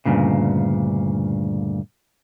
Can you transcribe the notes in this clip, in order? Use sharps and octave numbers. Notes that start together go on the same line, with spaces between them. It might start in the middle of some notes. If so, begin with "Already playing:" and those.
D2 G2 A#2 C#3